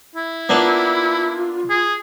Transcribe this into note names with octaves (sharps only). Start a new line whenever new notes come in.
E4
A#3 B3 D4 F4
G#4